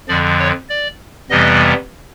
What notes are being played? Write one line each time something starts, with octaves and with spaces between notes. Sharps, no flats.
F2 D3 F3 D5
C#5
D5
F2 C3 E3 G3 B3 D#5